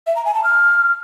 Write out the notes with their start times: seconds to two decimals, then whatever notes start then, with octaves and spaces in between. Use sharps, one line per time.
0.07 E5
0.16 A#5
0.25 G#5
0.35 A5
0.44 F6